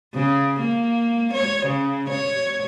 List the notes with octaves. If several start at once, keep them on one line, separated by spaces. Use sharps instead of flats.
C#3
A#3
C#5
C#3
C#5